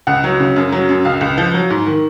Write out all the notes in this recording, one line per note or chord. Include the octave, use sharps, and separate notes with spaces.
C#2 F#5
F#3
C#3
F#2
F#3
F#2
C#2 F5
C#2
F3
F#3
G#2
D#3